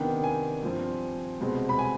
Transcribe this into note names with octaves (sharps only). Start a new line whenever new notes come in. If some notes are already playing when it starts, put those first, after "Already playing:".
Already playing: C3 D#3 B3 D4 G5
G#5
G2 F3 C4
C2 B2 G#3 C4
B5
G#5